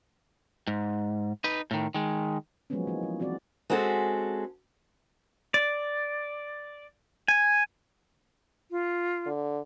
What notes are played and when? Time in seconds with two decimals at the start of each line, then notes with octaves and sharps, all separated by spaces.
0.67 G#2
1.44 D#4 B4
1.71 A2 D#3
1.94 D#3 G#3
2.70 F3 F#3 G#3 A#3 B3 C#4
2.87 E3 A#3 D#4
3.03 F3
3.20 E3 C4 F#4 D5
3.70 G#3 C4 C#4 F#4 G#4 A4
5.54 D5
7.28 G#5
8.71 F4
9.26 D3